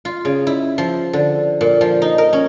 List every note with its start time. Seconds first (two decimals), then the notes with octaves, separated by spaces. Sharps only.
0.05 F4
0.25 C#3
0.47 E4
0.78 F3
1.13 D3
1.61 A#2
1.81 F3
2.02 D#4
2.18 A#4
2.33 C#4